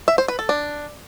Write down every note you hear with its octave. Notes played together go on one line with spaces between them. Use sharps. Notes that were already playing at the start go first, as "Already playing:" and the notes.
E5
C5
B4
A4
D4